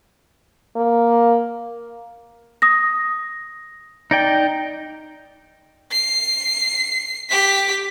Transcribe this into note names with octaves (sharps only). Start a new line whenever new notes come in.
A#3
D#6 A#6
D#4 D5 G5
C7
G4 B6